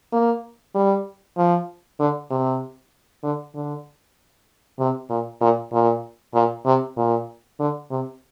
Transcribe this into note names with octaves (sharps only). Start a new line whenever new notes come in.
A#3
G3
F3
D3
C3
D3
D3
C3
A#2
A#2
A#2
A#2
C3
A#2
D3
C3